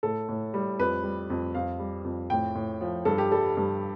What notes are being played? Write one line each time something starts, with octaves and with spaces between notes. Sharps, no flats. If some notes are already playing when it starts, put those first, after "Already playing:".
A2 A4
A2
G3
F2 B4
G3
F2
F2 F5
G3
F2
A2 G5
A2
F3
G2 A4
G4
G3 A4
G2